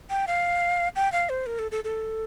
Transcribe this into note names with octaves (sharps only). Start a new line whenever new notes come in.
G5
F5
G5
F5
C5
A#4
A4
A4
A4